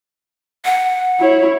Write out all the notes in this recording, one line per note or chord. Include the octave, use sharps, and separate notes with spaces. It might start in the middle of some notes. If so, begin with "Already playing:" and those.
F#5
E4 C#5